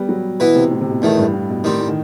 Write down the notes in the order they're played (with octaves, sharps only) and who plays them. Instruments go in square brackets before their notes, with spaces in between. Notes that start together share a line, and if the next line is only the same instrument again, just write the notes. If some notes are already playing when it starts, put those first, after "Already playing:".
Already playing: [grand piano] G3 B3
F#3
[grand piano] B2 [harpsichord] E3 B3 E4 B4
[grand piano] C3
A2
C3
B2
[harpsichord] E2 D#3 A3 [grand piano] A2
[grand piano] G2
A2
B2
[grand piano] A2 [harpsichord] D#3 G3 C4
[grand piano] A2
D#3